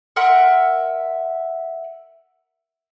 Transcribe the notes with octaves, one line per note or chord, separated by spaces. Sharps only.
A#4 E5 F#5 C6